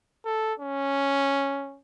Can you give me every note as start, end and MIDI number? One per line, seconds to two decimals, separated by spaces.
0.25 0.54 69
0.60 1.79 61